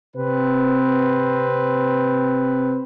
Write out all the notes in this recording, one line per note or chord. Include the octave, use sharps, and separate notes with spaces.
C3 C4 B4